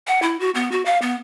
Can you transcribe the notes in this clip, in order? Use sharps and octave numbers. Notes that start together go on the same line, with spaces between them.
F#5
E4
F#4
B3
F#4
F5
B3